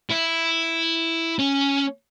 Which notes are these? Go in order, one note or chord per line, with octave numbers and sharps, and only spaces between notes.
E4
C#4